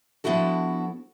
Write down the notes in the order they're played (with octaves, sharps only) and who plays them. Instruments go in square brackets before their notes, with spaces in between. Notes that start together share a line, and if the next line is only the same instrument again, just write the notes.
[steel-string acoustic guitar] F3 B3 D4 E4 F#4 A4